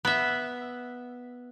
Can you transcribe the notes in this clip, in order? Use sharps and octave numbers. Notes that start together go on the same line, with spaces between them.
B3 E5